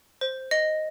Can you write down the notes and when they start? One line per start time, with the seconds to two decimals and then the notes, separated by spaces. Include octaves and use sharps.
0.21 C5
0.51 D#5